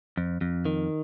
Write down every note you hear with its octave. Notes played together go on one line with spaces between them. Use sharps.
F2
F2
D#3